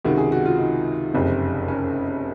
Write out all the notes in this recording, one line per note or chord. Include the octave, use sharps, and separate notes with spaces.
C#2 C3 D#3 F#4
G#4
F#4
F4
D#4
F#1 F2 C3
C#4